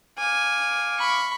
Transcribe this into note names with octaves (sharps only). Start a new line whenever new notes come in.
F5 G#5 D6 F6
B5 C#6